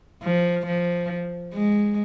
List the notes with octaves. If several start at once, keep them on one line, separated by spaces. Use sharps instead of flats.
F3
F3
G#3